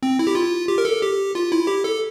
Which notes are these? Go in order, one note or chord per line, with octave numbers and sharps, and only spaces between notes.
C4
E4
G4
F4
G4
A#4
A4
G4
F4
E4
G4
A4